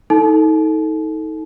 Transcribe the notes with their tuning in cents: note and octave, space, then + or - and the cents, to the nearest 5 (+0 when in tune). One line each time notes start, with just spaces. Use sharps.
D#4 +30 A4 +0 A5 -45